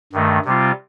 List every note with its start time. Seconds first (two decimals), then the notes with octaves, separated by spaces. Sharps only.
0.13 G2 D#3 A3
0.45 C3 G3 C4 F4